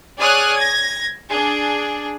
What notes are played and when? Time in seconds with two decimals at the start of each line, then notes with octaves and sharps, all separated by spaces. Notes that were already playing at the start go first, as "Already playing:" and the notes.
0.19 G#4 C#5 D5 D#6 F6 F#6
0.56 G#6 A#6
1.28 D4 G#4